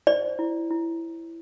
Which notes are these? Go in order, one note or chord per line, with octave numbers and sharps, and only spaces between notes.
C5 D5
E4
E4